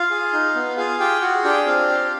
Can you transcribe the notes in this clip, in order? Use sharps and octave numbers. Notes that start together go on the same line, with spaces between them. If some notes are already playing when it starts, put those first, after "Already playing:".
Already playing: F4 F5
G#4
D#4
B3
F4 G#4 F5
F4 G4 G5
F#4 G#4 F#5
D4 G4 G5
C4 F4 F5
G4